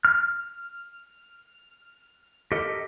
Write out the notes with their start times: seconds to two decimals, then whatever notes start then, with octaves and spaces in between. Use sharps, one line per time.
0.05 F6
2.52 G4 A4 A#4 D#5